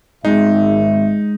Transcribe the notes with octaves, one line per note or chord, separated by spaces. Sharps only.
G#1 G#3 D#4 E5